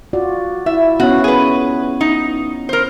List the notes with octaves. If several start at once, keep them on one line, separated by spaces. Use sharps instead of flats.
F4 F#4 D5
E4 E5
B3 C#4 F#4 C#5
G#4 B4
D#4
A#4 C5